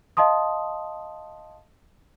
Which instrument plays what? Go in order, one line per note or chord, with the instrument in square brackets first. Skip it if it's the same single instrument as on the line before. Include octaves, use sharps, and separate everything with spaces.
[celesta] D#5 F5 A5 C6 D#6